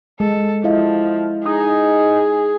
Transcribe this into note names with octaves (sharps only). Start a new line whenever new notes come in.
G#3 A4
F3 E4 D#5 F5
D#4 G#4